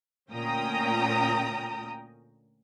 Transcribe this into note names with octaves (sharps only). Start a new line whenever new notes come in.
D2 A#2 C#4 G5 A#5 D#6